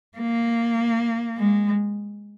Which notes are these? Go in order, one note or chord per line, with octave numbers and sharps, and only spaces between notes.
A#3
G#3